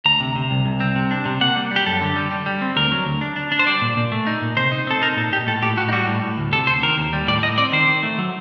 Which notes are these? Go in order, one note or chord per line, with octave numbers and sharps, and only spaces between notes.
D2 A#5
C3
C3
C2
C2
C4
C3
D4
C3
A#3 F#5
G3
G3
G4
F#2 A4
D3
G3
G3
G3
C4
D2 A#4
F#3
D2
D4
D4
D4
C5
G3 D5
A#2
A#2
A3
D#4
A#2
C3 C5
D#4
C4 A4
D#4 A#4
A#2 A4
A#2 G4
A2 A4
A2 G4
A2 F#4
D#4
G3 F#4
A2
A2
D2
C3 A4
D2 C5
D#3 A#4
D#2
G3
A2 D5
A2 D#5
C4 D5
D#3 C5
D#3
A3
F#3